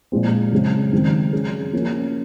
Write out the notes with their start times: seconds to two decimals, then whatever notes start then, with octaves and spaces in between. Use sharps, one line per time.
0.12 A#2 F3 G#3 C4
0.52 F#2 C#3 G#3 C4
0.93 F#2 D#3 G#3 C4
1.33 F#3 C#4 G#4
1.73 F3 A#3 C#4